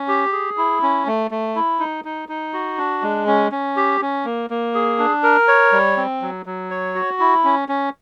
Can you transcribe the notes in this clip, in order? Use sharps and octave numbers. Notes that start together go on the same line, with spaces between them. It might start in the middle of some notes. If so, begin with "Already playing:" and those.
Already playing: C#4
G4
G#4
E4
C#4
A3
A3
E4
D#4
D#4
D#4
F#4
D4
G#3
C#4
C#4
G4
C#4
A#3
A#3
G#4
D4
A#4
C#5
G3
C4
F#3
F#3
C#5
F#4
E4
C#4
C#4